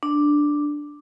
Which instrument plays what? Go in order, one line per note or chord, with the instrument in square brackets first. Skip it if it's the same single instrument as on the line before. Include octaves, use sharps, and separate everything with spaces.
[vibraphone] D4